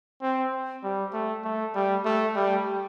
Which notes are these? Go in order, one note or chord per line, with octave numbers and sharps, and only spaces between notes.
C4
G3
A3
A3
G3
A3
G3